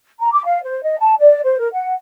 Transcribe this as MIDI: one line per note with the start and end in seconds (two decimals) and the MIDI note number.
0.19 0.30 82
0.32 0.43 86
0.46 0.59 77
0.64 0.81 72
0.83 0.99 75
0.99 1.14 81
1.19 1.40 74
1.44 1.59 72
1.59 1.68 70
1.73 1.94 78